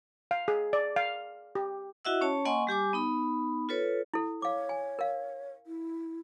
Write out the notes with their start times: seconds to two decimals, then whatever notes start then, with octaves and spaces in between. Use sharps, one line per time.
0.31 F5
0.48 G#4
0.73 D5
0.96 F5
1.55 G4
2.05 E4 F#4 D#5 E5 F#5 E6
2.21 C#4 C#5 A5
2.45 A#3 D#5 F#5 G#5 C6 C#6
2.67 G3 G4 G#5 D6
2.93 B3 D#4 B5
3.69 F4 A4 B4 C#5
4.14 E4 A4
4.42 C#5 F5 D6
4.69 G#5
4.99 A#4 F5
5.67 E4